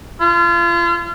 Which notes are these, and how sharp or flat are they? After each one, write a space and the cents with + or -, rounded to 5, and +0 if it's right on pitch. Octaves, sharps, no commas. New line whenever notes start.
F4 -35